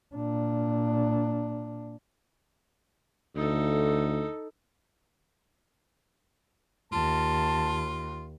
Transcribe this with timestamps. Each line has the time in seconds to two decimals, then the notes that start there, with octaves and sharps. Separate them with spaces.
0.15 A#2 D4
3.36 D2 D#4 A4
6.92 D#2 F4 A5